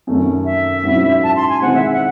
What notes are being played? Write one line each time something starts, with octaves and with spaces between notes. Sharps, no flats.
F#2 D#3 A3 C#4
E5
G#2 F#3 C#4 E4
A5
C6
G#5
D#3 G#3 C4 E4 F#5
E5
F#5